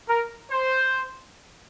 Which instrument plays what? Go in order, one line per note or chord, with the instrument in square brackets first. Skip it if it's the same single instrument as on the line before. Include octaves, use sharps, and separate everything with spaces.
[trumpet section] A#4
C5